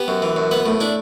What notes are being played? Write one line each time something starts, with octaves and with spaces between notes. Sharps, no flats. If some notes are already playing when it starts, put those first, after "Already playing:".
Already playing: B3 G4
F#2
E3
F#2
B3 B4
A2
D4 E4